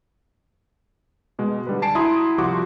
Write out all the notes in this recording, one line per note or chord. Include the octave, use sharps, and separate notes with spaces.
B2 G#3
D3 G3 B4
G#5 A5 C7 D7
E4 F#4 A#5 C6 D#6
C2 F3 F#4 G4 C6 D6